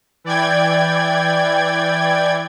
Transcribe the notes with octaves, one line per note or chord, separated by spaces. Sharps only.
E3 D5 G5 G#6